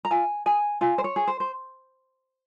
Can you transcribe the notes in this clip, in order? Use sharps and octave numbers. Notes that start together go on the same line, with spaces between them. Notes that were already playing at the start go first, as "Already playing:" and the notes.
A#5
F4 G#5
G#4 G#5
F4 G#5
C5
C#5
G#4
C5
C5